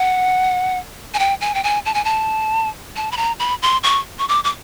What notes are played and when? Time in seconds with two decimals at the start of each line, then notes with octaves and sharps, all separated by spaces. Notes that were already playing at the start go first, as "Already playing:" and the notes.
Already playing: F#5
1.14 G#5
1.19 G5
1.41 G#5
1.54 G5
1.64 G#5
1.86 A5
1.94 G#5
2.05 A5
2.96 A5
3.12 B5
3.17 A#5
3.39 B5
3.62 C6
3.83 C#6
4.19 C#6
4.28 D6
4.44 D6